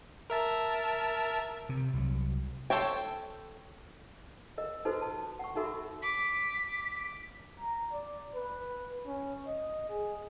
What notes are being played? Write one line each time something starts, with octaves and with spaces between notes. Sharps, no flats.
A#4 E5 A5
C3
C2 F#3
A4 C5 C#5 G5
A#4 D#5
D#4 F4 F#4 A4 B4 C5
A5
F#5 C#6
D#4 F#4 A4 A#4 E5 B5
D6 B6
A#5
D5
B4
C#4
D#5
G#4